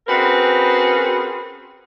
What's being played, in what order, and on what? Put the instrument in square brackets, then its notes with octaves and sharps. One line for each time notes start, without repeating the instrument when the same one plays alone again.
[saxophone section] C4 C#4 F#4 G#4 A#4 B4